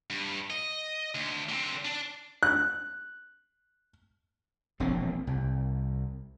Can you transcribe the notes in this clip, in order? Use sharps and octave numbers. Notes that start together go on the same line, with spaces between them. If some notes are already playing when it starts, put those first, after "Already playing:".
G2
D#5
D2
D3 C4
D4
F#6
E1 A#1 D3 C4
C2